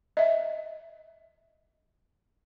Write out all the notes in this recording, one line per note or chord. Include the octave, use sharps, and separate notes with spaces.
D#5 E5